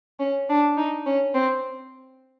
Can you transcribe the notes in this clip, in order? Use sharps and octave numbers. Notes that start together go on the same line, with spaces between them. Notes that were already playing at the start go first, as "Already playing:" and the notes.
C#4
D4
D#4
C#4
C4